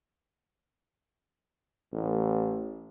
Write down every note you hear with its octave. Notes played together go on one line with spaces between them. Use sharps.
A1